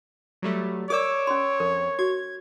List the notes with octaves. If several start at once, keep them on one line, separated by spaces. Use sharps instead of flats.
F#3 G3 A3
G#4 A#4 C#5 D5 D6 E6
C#4 C6
F2 A#4
F#4 G#6